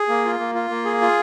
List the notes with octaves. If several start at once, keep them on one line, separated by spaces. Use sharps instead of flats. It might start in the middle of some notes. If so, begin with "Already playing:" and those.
Already playing: G#4
A#3
F4
A#3
F4
A#3
G#4
F4